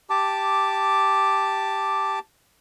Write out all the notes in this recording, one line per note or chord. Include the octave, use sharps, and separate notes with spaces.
G4 A5 D6